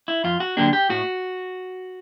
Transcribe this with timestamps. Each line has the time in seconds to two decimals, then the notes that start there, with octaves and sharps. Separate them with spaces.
0.08 E4
0.24 F2 F4
0.40 F#4
0.57 D3 F#3 A#3 D4 G4
0.73 G4
0.89 A2 F#4